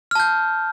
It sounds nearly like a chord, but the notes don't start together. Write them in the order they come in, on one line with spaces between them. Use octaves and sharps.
F6 A5 G6